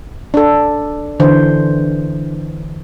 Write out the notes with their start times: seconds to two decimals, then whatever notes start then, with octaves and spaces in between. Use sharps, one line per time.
0.34 D4 A4
1.20 D3 E3 C5